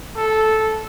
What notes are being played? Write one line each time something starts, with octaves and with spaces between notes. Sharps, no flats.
A4